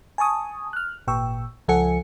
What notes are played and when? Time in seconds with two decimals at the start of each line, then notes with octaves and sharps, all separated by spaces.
0.18 G#5 A5 C#6 D#6
0.73 F6 F#6
1.07 G#1 A#2 G5 C#6 E6
1.68 C#2 F3 A4 F#5 G#5 C#7